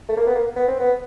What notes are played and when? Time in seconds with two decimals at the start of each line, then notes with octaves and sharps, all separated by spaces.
0.09 A3
0.17 A#3
0.27 B3
0.35 A#3
0.56 B3
0.68 C4
0.80 B3